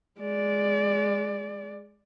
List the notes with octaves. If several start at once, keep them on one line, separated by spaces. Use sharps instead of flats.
G#3 D5